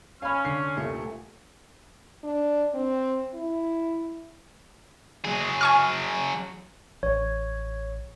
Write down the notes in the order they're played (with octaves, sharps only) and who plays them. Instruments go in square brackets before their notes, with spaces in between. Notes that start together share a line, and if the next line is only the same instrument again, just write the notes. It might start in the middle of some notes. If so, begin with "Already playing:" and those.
[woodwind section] C#4 [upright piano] F5 B5
[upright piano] D3 C7
D#1 A#2 A3
[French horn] D4
C4
E4
[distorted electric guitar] F#3 G#4
[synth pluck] G#5 C#6 F6
[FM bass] A1 [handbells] C#5